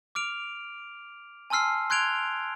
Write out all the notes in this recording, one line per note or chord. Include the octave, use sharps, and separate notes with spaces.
D6 F6 D7 F7
G#5 A5 C6 E6 F6 C7
C6 F#6 G#6 D7 F7 G7